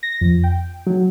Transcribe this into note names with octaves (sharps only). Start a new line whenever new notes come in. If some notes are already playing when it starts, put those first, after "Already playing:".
A#6
F2
G5
F#3